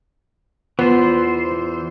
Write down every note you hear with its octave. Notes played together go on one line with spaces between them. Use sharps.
E2 E3 B3 F4 C5 B5